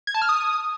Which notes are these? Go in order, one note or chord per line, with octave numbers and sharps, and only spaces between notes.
G#6
A5
F6
D#6